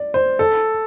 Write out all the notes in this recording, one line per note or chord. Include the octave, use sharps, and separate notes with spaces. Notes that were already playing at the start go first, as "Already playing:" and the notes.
Already playing: D5
C5
A4